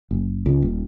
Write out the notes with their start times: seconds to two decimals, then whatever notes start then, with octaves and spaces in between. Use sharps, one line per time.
0.11 F#1
0.46 C#2
0.62 D#1